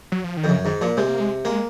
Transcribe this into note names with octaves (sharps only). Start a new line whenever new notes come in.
F#3
F3
D#3
F2
F#2 C#3
G#2 D#3
A#2 F3
C3 G#3
A#3
G#3
G#3 A#3